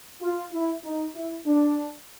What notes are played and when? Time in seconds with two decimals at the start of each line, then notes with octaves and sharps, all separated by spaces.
0.22 F4
0.52 E4
0.84 D#4
1.15 E4
1.46 D4